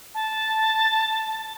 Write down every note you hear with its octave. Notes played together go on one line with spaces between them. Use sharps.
A5